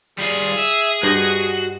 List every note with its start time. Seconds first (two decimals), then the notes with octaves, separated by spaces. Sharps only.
0.19 G3 F4 G#4
0.58 E5
1.03 G2 F#4 C5 D#5